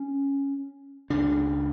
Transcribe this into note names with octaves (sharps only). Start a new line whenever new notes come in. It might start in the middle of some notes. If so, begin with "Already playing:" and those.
Already playing: C#4
C#2 C#3 D4